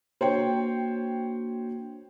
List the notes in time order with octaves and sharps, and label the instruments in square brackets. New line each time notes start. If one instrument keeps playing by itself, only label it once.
[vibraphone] A#3 D4 F#4 [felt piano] C5 C#5 G5